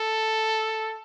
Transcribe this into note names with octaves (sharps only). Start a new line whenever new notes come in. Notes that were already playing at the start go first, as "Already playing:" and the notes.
Already playing: A4